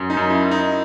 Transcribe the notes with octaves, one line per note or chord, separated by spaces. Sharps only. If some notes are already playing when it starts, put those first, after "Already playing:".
Already playing: F#2
D#4
F#2
E4
F#2
D#4